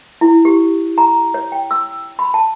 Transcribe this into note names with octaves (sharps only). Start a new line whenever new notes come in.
E4
G4
A#5
C#5
G5
E6
B5
A5